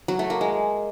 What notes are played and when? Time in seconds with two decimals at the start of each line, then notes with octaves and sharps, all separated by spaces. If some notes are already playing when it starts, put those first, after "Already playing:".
0.08 F#3
0.19 A3
0.30 A#3
0.41 G#3